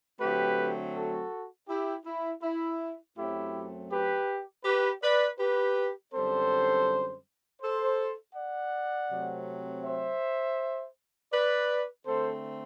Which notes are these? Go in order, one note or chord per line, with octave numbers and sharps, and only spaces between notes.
D3 F#3 A3 C4 G4 B4
F#4 A4
E4 G4
E4
E4
F#2 F#3 A3 C4 E4 G4
G4 B4
G4 B4
B4 D5
G4 B4
F#2 D3 G3 C4 A4 C5
A4 C5
D5 F#5
C3 F#3 A3 C4
C5 E5
B4 D5
D3 A3 C4 A4 C5